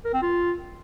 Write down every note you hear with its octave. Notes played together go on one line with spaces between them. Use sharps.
A#4
C4
F4